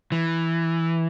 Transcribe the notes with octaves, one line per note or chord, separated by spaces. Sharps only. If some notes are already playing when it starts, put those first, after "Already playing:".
E3